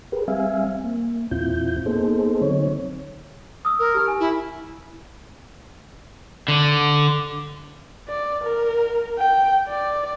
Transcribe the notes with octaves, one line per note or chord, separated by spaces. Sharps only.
G4 G#4 A#4 B4
G3 C4 E5 F5 G#5
A#3
E2 A#2 C4 E4 F4 G6
A#3 B3 D#4 G#4 A4 C5
D3 F#3 C4 D#4 C#5
D#6 E6
A#4
D#4 G4
G#5
E4
D3
D5
A#4
G5
D5